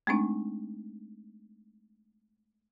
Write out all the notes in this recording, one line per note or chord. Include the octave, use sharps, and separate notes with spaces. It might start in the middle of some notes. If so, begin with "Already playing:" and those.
G#3 A3 C4 D4 D#4